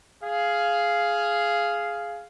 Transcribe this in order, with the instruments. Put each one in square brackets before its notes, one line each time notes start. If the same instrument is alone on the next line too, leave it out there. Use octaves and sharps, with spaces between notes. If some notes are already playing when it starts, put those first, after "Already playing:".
[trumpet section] G#4 F5